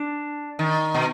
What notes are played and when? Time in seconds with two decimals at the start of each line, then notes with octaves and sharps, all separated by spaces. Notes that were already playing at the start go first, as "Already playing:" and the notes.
Already playing: D4
0.59 D#3
0.94 B2